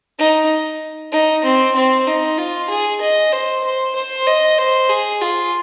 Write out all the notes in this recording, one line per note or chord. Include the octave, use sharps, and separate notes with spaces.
D#4
D#4
C4
C4
D#4
F4
G#4
D#5
C5
C5
C5
D#5
C5
G#4
F4